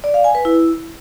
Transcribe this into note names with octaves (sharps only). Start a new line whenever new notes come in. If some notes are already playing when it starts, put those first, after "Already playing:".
D5
F5
G#5
B4
E4